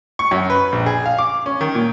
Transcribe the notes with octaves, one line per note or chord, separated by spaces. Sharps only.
C#6
F#2
B4
A#1
G#4
F5
D6
C#4
D#3
A#2